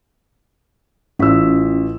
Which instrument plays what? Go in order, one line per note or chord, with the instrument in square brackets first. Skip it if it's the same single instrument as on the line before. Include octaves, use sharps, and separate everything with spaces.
[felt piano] A1 E6 [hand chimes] C#4 F4 B6